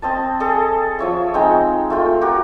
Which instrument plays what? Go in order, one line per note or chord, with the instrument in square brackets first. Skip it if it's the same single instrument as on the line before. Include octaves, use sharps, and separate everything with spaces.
[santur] C4 D#5 A5
G#4 A4 D#5 A5
F3 C#5 E5
G#3 C4 D#4 G5
A3 F4 G5
F#4 G4 A#4